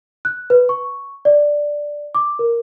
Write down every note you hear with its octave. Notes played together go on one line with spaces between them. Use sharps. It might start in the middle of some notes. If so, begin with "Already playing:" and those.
F#6
B4
C#6
D5
D6
A#4